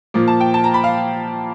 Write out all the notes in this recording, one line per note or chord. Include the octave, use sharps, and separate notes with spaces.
A#2 F3 A#3
A5
G5
A5
A#5
B5
F5